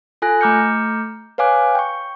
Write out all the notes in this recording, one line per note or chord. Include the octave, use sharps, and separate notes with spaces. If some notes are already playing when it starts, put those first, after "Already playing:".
F4 A4 G#5 F#6 A#6
A3 A#5 D6 F6 G6 C#7
B4 C#5 F5 G#5 D6 F#6
G5 C#6